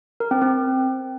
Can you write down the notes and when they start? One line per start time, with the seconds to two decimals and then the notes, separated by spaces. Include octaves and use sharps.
0.20 A#4
0.31 C4
0.42 C4